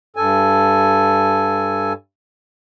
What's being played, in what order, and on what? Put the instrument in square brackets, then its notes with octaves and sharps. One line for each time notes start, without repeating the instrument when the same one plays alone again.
[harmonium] G2 A4 G#5